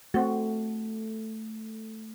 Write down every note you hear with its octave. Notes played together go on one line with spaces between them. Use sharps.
A3 C4 F#4